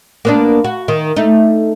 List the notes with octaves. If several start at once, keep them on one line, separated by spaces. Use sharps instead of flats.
A#3 B3 D4
F#4
D#3
A3 D#4